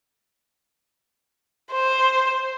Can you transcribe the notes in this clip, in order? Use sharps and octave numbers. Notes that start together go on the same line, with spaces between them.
C5